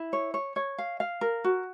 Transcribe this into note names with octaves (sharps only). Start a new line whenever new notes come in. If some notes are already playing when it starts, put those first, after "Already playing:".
Already playing: E4
C#5
C#5
C#5
F5
F5
A#4
F#4